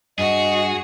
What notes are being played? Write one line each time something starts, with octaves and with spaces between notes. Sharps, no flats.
G2 F#4 G#4 D#5